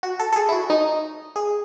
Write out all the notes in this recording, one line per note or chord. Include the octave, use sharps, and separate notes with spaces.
F#4
A4
A4
G#4
E4
F#4
D#4
G#4